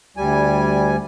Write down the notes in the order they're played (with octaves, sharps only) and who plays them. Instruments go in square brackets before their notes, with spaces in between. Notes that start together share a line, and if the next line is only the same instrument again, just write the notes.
[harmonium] D2 G3 G#5